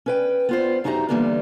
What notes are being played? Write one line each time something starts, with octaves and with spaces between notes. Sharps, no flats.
C#4 B4 G5
B3 F4 C5
F#2 D#4 F#4 G4 E5 A#5
D3 E3 G3 A#3 B3 D4